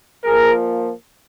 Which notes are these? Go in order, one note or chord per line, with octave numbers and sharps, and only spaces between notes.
A#2 F3 A#3 G#4 A#4